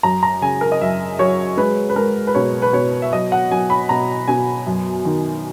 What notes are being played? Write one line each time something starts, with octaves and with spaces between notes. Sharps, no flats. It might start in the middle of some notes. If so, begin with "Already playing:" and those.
F#2 A#5
A#5
C#3 G#5
A#4
D#5
F#2 E5
F#3 C#5
G#3 B4
B4
G#3 A#4
B4
B2 C#5
B4
B2 C#5
E5
F#3 D#5
F#5
F#3 G#5
B5
B2 A#5
B2 G#5
F#2
D#3